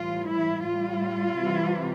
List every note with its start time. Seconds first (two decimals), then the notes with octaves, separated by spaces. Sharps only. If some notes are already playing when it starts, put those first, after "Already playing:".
Already playing: A2 E3 G3 F4
0.29 E4
0.67 A2 G3 F4
1.41 C3 E3 G3